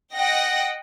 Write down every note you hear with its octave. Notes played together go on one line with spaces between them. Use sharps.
D#5 F#5 G5 A#6